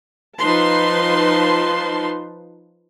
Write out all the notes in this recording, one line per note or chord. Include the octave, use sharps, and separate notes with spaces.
F3 D#4 B4 A5 C6